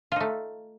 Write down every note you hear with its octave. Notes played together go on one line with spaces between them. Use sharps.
A3 D#4 F4